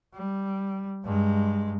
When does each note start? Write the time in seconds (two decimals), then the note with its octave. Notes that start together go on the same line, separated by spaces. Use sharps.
0.14 G3
1.04 G2 G#3